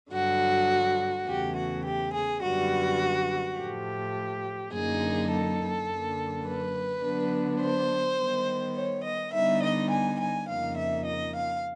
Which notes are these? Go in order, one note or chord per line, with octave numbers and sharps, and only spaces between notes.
G2 D3 F#3 F#4
E2 C#3 E3 A3 G4
F#4
G4
G#4
F#2 D3 G3 B3 F#4
A2 F3 A3 G4
F#2 D3 F#3 A#3 D#4 G#4
A4
F#2 D3 F#3 A#3
B4
D3 F#3 B3 D4
C5
D#3 G3 B3
C#5
D#5
D3 G3 B3 D#4 E5
D#5
G#5
G#5
F2 C#3 F3 A#3 D#4 F5
E5
D#5
F5